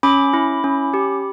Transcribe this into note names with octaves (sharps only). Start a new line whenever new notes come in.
C#4 B5 D6
E4
C#4
G4